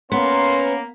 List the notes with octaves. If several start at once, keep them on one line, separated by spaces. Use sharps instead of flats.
A#3 B3 C#4 C6